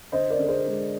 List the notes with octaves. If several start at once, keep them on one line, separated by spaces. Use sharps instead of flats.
D3 C5 D#5
A#4 D5
D3
A#4
G#4 C5
G#3